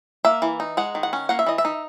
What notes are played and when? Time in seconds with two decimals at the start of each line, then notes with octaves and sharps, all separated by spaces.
0.25 A#3 E5
0.42 E3
0.60 D#4
0.77 G#3 F#5
0.95 D#3
1.03 F#5
1.13 C#4
1.29 A#3 F#5
1.39 E5
1.47 E3 D#5
1.58 E5
1.65 D#4